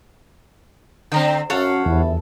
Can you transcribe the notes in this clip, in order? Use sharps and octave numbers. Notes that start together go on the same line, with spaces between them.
D3 C4 G5 A#5
F#2 A4 C#5 F5 F#5
G1 E2 E4